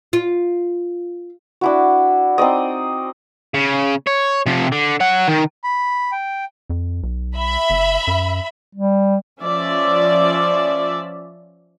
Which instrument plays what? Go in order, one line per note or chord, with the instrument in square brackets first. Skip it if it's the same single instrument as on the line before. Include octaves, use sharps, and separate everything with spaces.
[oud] F4
[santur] D4 E4 F#4
C4 D#4 D5 D#5
[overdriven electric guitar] C#3
C#5
C3 F3
D3
C#5 F#5
D#3
[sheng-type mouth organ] B5
G5
[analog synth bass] F2
B1
[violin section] E5 B5
[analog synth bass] F#1
F#2
[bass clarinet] G3
[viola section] F3 C#4 D5 E5